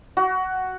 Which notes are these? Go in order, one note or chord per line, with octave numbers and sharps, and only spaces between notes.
F#4